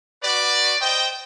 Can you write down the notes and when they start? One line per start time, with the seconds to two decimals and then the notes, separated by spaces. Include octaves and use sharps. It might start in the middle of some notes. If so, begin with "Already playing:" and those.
0.23 F#4 B4 D5
0.81 C5 D#5 G5